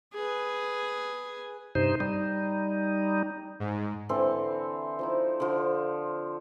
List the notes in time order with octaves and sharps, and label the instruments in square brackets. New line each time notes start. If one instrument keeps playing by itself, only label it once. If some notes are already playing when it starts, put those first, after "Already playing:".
[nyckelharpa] G#4 B4
[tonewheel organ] G2 C3 D#4 C5
G3 D#4
[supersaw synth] G#2
[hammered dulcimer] D3 E3 C4 A4
F3 D#4 E4
D3 F3